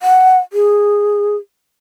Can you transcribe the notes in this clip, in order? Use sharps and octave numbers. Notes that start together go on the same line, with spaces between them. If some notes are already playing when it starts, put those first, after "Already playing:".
F#5
G#4